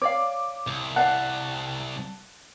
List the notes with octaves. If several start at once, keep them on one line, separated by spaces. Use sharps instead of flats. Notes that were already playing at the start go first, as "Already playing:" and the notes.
C#5 D5 F5 D6
C2
D5 F5 F#5 A5 F#6